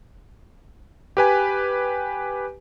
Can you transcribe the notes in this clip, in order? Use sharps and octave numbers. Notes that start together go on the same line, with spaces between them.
G4 B4 G#5